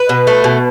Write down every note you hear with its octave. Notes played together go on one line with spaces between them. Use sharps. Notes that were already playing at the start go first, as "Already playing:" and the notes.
Already playing: B4
B2
A3
B2